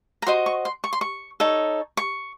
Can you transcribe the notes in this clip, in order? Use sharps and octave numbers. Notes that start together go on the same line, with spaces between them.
A#5
F#4 C5 D#5 C6
C#6
C6
C#6
C6
C#6
D#4 A4 C#5
C#6